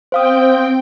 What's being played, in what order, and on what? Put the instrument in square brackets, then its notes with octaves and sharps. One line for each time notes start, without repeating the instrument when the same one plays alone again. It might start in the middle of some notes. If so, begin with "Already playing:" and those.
[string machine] C4 G5 [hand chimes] C5 F5 D#6